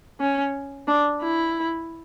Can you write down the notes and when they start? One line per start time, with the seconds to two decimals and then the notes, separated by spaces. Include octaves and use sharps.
0.20 C#4
0.88 D4
1.22 E4